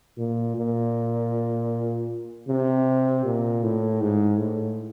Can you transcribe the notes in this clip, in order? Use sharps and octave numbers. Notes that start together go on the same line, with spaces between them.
A#2
A#2
C3
A#2
A2
G#2
A2